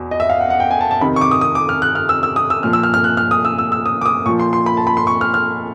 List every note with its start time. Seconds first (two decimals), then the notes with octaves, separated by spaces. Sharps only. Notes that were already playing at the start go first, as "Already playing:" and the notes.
Already playing: E2 B2
0.11 D#5
0.20 E5
0.30 F5
0.40 F#5
0.50 F#5
0.60 G5
0.71 G#5
0.81 A5
0.91 A5
1.01 F2 C3 D#3 B5
1.16 C#6
1.21 D6
1.31 D#6
1.41 D#6
1.55 D6
1.69 F6
1.82 F#6
1.95 F6
2.09 E6
2.23 E6
2.36 D#6
2.50 E6
2.63 A#2 F3 F6
2.73 E6
2.83 F6
2.94 F6
3.04 F#6
3.17 F6
3.31 D#6
3.45 E6
3.58 E6
3.72 E6
3.86 D#6
4.01 D6
4.06 D#6
4.26 A#2 F3 C#6
4.40 C6
4.53 C6
4.66 B5
4.77 A5
4.87 B5
4.97 C6
5.07 C#6
5.21 F6
5.34 F6